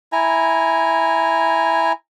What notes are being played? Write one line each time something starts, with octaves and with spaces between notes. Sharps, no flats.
E4 G#5 A#5